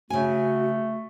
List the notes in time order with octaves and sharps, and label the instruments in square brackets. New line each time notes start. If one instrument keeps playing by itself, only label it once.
[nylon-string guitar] C#3 G#5 [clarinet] A3 [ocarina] F#4